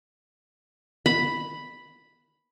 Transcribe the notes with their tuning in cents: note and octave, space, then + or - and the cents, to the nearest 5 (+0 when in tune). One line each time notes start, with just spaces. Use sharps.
B5 +0